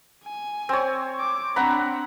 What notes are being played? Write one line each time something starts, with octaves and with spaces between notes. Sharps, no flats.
G#5
C4 C#5
D6
C4 D4 F#5 A#5 B5